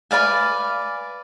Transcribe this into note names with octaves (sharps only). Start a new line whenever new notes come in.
B4 D5 F5 G#5